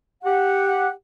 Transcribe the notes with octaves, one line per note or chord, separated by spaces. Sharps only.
G4 F#5